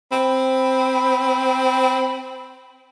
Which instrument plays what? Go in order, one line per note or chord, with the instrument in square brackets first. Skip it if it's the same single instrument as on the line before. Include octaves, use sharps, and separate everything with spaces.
[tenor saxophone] C4 [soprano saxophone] B5